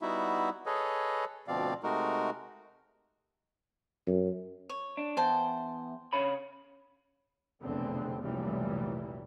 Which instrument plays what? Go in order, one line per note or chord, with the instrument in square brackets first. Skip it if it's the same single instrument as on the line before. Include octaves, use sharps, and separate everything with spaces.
[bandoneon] G3 B3 D#4 E4 F#4 E5
G#4 A4 B4 C#5 D#5
D2 B2 F3 C4 D5 F5
C3 G#3 A3 D#4 F#4 A#4
[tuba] F#2
[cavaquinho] C#5
[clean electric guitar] D4
[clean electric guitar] E2 [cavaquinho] C5 G5 A5
[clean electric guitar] C#3 C#5 B5
[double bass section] F1 B1 E2 D3 C4
F1 C2 A#2 E3 F#3 G3